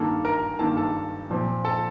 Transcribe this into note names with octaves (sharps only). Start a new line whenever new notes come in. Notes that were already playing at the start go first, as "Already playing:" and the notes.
Already playing: G2 D#3 A#3 A4
A#4 A#5
G2 D#3 A#3 A4 A5
A4 A5
A#2 F3 C4
A4 A5